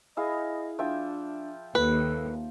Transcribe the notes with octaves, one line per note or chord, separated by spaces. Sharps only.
E4 G#4 D#5 F5
F3 D4 E5 G5
D#2 A4 B4